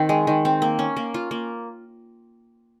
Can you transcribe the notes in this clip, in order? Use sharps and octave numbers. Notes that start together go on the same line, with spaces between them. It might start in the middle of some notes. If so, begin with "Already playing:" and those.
Already playing: D#3 C4
G#3
D#3
C4
A#3
C#4
A#3
F4
A#3